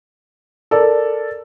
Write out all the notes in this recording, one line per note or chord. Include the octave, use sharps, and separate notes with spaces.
A4 A#4 D5